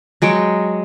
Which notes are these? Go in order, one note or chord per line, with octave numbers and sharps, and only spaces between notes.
F#3 G#3 G5 C#6